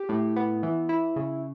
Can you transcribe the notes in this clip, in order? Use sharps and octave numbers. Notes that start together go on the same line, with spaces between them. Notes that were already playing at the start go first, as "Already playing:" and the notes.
Already playing: G4
A2
B3
E3
E4
C#3